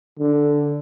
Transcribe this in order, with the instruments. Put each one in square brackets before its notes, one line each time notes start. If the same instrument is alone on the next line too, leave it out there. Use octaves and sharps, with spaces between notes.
[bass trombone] D3